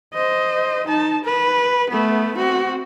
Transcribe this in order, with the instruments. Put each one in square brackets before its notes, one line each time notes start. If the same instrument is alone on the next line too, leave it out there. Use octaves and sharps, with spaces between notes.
[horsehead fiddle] C5 D#5
D#4 A5
B4
A3 B3
C4 F#4